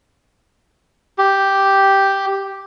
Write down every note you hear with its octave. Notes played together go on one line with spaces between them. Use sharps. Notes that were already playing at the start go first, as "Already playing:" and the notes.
G4